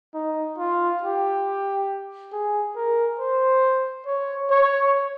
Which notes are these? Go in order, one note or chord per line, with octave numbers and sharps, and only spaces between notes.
D#4
F4
G4
G#4
A#4
C5
C#5
C#5